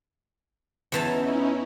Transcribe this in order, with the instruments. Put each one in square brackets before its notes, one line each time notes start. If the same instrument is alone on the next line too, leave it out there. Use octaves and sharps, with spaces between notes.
[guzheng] E2 E3 A5 [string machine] C#4 D#4 E4